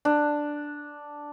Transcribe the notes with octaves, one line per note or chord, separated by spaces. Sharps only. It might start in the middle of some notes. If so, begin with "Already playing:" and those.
D4